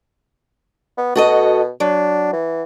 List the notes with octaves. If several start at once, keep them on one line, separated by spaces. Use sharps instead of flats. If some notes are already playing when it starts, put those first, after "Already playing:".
B3
B2 F#4 A4 D#5
F#3 D4
E3